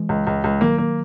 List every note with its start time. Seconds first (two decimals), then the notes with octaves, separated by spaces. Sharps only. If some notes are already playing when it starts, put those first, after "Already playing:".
Already playing: E3 G#3
0.09 C#2
0.27 C#2
0.44 C#2
0.61 D#3 F#3 A#3
0.78 A#3